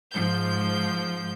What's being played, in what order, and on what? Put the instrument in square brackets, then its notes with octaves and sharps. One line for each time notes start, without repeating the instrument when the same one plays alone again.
[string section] G#2 F3 G6